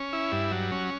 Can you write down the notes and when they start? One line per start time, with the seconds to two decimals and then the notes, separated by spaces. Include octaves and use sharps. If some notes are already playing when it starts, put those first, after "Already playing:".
Already playing: C#4
0.13 E4
0.32 G2
0.51 F#3
0.72 C#4